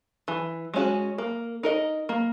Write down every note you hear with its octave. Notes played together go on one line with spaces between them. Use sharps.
E3
G#3 C#4 F#4
A#3
D#4 A#4 D#5
A#3